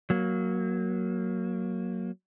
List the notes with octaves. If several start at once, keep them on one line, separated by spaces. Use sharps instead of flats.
F#3 A#3